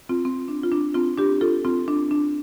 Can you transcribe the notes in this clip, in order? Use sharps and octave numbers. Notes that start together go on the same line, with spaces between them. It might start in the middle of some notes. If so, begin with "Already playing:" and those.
C4 F4
C4
D4
F4
D4
C4 F4
D4 G4
F4 A4
C4 F4
D4
D4